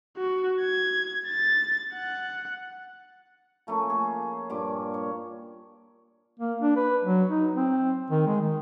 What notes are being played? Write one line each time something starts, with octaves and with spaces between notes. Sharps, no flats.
F#4
G#6
A6
F#5
F3 A3 A#3 C#4
G#4
G2 A#2 D6
C#5
A#3
D4
B4
F#3
D#4
C4
D#3
G#3
D#3